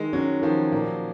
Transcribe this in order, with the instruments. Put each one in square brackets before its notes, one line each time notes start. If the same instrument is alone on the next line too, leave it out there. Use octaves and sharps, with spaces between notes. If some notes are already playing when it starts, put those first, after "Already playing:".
Already playing: [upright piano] D#3 [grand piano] G#3
[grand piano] F#3 [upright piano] C#4
[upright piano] D#3 [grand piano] F3
[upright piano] A#2 [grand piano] A#3